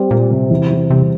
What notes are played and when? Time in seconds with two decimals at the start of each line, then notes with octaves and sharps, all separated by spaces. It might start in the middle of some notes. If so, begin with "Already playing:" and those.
Already playing: G3 C4
0.11 A#2 G3
0.31 C3
0.51 E2
0.70 E2
0.90 C3 G3